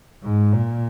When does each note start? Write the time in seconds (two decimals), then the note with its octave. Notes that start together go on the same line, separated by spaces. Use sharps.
0.23 G#2
0.52 A#2